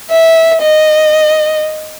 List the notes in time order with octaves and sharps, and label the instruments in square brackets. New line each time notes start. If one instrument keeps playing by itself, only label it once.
[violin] E5
D#5